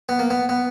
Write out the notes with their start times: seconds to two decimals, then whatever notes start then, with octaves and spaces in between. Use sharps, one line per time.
0.09 B3
0.19 A#3
0.31 B3
0.49 B3